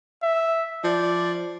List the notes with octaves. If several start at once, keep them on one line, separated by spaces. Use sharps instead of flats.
E5
F3 D5